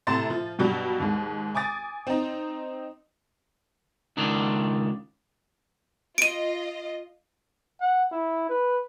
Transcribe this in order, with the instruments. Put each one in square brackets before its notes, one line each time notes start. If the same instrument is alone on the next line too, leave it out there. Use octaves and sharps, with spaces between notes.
[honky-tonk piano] A2 C3 A5 A#5 C6 A6
F3
G2 B2 F#3 G3
D#2 G#2
G#5 D6 D#6 A6
C4 D#4
[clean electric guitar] C#2 D#3 D4
[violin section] F4 D#5 [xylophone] D7 D#7
[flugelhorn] F#5
E4
B4